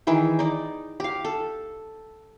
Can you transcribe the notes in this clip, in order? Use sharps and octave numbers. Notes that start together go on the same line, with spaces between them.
D#3 E3 G#4 G5
D#4 D5
G4 F5
A4